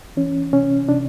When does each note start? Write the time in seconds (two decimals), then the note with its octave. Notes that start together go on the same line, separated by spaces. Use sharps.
0.17 E3 C#4
0.53 C3 C#4
0.88 C3 D4